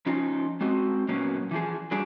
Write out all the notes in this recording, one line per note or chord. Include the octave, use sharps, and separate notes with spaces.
F3 C#4 D#4 F4
G#3 C4 F#4 D#5
A#2 F#3 A#3 B3 C#4 F#4
E3 F3 G#4
F#3 G3 D4 G#4